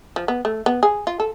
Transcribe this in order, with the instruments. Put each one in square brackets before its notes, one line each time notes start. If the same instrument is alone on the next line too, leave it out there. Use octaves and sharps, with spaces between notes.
[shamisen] F3
B3
A3
B3
G#4
F4
A4